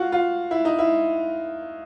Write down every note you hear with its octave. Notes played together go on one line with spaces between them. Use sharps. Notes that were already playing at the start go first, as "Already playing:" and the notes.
Already playing: F4 F#4
F4
E4
D#4
E4